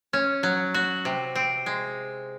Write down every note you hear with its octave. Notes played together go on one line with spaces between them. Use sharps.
C#4
F#3
F#4
C3
C4
G#3